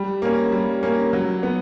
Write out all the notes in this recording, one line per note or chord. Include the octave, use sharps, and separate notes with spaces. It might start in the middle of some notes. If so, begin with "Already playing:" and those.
Already playing: G3
A#3 C#4
G3
A#3 C#4
F#3
B3